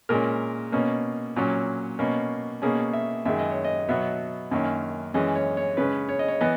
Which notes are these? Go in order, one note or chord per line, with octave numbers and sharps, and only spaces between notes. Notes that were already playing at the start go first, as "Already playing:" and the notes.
A#2 G#3 C#4 A#4
B2 A#3 C#4
A#2 F#3 C#4
B2 A#3 C#4
B2 A#3 C#4 G#4
E5
F#2 D#3 G#3 E5
D#5
C#5
D#5
B2 F#3 B3 E5
F#2 D#3 A#3 C#4
F#2 E3 G#3 C#4 D#5
C#5
C#5
C#3 G#3 C#4 B4
C#5
D#5
C#5
E3 B3 D#5